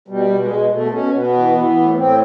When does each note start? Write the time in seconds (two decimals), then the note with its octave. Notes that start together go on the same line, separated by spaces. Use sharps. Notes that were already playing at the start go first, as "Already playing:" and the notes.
0.08 B2 G3
0.29 B2
0.39 G#3
0.51 B2
0.71 B2 A3
0.92 B2 C#4
1.13 B2 B3
1.34 E3
1.55 E3
1.76 A2
1.96 A2 C4